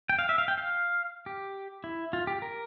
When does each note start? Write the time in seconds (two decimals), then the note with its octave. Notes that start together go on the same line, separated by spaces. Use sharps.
0.09 G5
0.19 F5
0.29 E5
0.38 F5
0.48 G5
0.58 F5
1.26 G4
1.84 E4
2.13 F4
2.27 G4
2.42 A#4